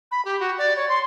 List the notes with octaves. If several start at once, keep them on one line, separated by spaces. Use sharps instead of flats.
B5
G4
F#4
D5
C#5
C6